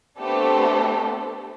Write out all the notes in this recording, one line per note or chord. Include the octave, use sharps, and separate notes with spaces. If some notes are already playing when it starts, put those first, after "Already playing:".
A3 B3 C4 D4 G4 A4